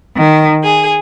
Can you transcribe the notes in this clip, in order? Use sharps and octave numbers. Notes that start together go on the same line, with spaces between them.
D#3
G#4